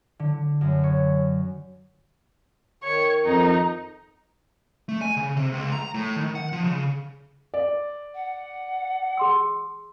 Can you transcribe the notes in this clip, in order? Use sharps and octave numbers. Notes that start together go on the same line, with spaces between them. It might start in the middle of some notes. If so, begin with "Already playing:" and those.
D3
F#2
C#5
D#3 C#5
F2 D#4
A3
G#5
C#3
C3
C#2
A#5
A2
D#3
F#5
F3
C#3
D5
F#5
G#4 C6 E6